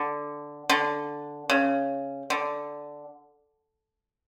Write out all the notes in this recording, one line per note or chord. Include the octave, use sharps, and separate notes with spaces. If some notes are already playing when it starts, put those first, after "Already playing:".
Already playing: D3
D3
C#3
D3